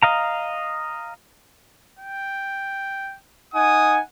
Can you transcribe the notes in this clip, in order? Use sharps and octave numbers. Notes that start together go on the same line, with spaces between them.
D#5 F5 A#5
G5
D#4 F#5 G#5 D#6